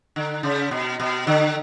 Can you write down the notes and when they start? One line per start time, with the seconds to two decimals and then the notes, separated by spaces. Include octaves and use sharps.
0.16 D3
0.43 C#3
0.71 B2
1.00 B2
1.27 D3